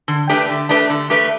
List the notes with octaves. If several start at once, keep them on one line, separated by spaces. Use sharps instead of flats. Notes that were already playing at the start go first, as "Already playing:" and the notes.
D3
A3 D4 G4 B4
D3
A3 D4 G4 B4
D3
A3 D4 G4 B4